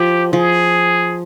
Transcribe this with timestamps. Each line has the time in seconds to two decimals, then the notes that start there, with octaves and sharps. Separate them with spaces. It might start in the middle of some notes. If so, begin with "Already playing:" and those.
Already playing: F3 G4
0.32 F3 G#4